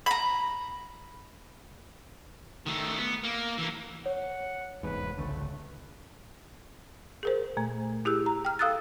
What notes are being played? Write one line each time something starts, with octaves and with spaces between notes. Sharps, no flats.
A#5 B5
D#3 A3
B3
A#3
E3 A#3
C#5 F#5
F1 E2 G#2 B4
G#1 C#2 D3 A3
G#4 A#4 C5
A#2 A3
E4 G4 G#4 E6
A#5
G5 F6
A4 F5 D#6 E6 F#6 A6